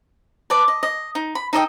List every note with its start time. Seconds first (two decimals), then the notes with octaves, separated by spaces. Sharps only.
0.50 B4 D5 A5
0.68 D#5
0.83 D#5
1.15 D#4
1.35 B5
1.53 D#4 A4 D#5 G5